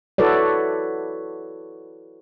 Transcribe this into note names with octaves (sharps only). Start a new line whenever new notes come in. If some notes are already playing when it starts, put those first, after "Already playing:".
E4 F#4 A4 B4 C#5 D5